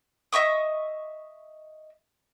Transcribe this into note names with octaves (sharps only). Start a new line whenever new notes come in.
D#5 E5 C#6 D#6